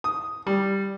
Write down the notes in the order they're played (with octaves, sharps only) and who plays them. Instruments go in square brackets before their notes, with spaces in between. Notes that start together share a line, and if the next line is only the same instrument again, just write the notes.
[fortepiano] D#6
G3